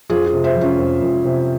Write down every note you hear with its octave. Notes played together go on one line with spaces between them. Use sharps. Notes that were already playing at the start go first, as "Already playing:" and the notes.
F2 F4 G#4
F4 G#4
C3
C5 E5
F3
C#4 F4
F2
F2
C3